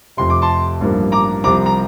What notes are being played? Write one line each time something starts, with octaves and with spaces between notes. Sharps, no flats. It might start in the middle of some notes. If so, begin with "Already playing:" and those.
F1 F2 C3 C6
D6
A5 C6
A1 G2 F3 A#3
A#5 D6
C2 C3 F3 C4 A#5 D6
A#5